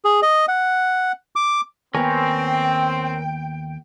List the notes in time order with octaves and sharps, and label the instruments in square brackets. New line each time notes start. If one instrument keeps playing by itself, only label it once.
[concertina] G#4
D#5
F#5
D6
[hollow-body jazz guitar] D#2 B3 [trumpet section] C4 [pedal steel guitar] A#4 C#5 G#5 [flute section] G5